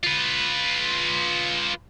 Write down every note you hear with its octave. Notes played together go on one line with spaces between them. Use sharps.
F4 B4